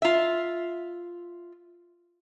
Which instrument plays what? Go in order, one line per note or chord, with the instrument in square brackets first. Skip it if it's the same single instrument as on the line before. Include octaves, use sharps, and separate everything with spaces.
[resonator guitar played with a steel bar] F4 E5